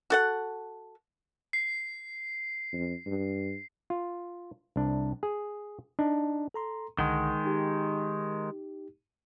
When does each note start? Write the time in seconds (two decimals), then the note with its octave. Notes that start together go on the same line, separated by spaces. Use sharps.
0.10 F#4 A4 F#5
1.53 C7
2.73 F2
3.06 G2
3.90 F4
4.76 C2 D4
5.23 G#4
5.99 D4 D#4
6.54 A4 A#5 C6
6.99 C2 D3 D#3 G#3 F#5
7.45 D#4 G4